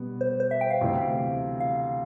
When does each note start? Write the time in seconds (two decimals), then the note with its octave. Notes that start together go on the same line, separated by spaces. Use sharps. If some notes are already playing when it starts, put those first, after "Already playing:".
Already playing: B2 G3 B3
0.21 C5
0.40 C5
0.51 E5
0.61 G5
0.70 F5
0.81 D2 C3 E3
1.60 F5